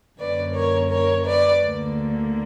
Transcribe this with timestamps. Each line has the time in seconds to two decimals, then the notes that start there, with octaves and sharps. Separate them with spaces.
0.19 F#2 D3 A#3 C#4 B4 D5
0.54 A#4 C#5
0.90 A#4 C#5
1.26 B4 D5
1.63 D2 D3 A#3